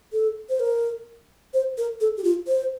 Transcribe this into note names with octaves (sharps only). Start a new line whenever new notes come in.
A4
C5
A#4
C5
A#4
A4
G4
F4
C5